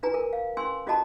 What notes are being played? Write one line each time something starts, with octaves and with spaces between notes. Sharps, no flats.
D4 F4 B4 G#5 A#5
A#4
F5
C#4 G#5 C6 E6
C#4 F4 F#4 D#5 A5 A#5